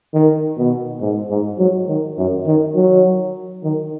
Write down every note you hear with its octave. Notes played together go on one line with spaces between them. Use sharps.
D#3
B2
G#2
G#2
F#3
D#3
F#2
D#3
F#3
D#3